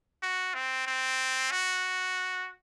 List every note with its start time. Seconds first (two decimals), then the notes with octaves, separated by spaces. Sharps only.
0.23 F#4
0.54 C4
0.87 C4
1.51 F#4